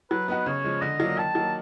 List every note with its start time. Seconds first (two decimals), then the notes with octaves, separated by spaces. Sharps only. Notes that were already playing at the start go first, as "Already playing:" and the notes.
0.10 F#3 B4
0.28 B3 D#4 F#4 B4
0.46 C#3 C#5
0.64 F3 G#3
0.81 D3 D#5
1.00 F#3 A#3 D4 F4
1.17 D#3 A5
1.35 F#3 A#3 D#4